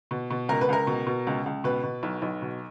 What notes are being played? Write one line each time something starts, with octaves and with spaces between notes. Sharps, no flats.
B2
B2
C#2 A#4
B4
C#2 A#4
B2
B2
C#2
C#2
B2 B4
B2
B1
B1
B2